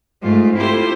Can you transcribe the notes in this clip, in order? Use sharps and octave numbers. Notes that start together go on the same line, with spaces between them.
G#2 A3 F4
C4 E4 F4 G4 A4 C5